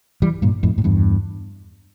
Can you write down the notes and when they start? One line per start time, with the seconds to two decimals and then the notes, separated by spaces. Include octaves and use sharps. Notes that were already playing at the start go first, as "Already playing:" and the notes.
0.22 E3 G3
0.42 G2 A#2
0.63 F2 A2
0.78 A2
0.84 E2 G2